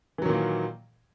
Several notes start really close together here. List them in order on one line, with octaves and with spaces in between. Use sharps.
E3 F#3 D#3 A#2 A#3